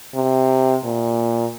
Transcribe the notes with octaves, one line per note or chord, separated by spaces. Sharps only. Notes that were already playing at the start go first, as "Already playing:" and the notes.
C3
A#2